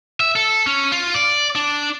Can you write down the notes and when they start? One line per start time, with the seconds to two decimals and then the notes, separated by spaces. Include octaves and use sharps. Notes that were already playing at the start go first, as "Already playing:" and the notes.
0.20 E5
0.36 A4
0.67 C#4
0.92 F4
1.14 D5
1.55 D4